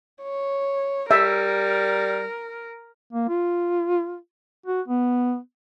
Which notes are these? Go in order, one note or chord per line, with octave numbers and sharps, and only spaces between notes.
C#5
G3 A#4 E5
A#3
F4
F#4
B3